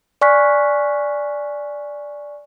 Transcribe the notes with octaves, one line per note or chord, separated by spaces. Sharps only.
D5 G#5 C#6 F6 F#6 B6